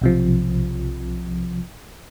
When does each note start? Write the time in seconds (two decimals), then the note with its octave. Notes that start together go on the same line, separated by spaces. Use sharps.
0.01 B1 C3 F3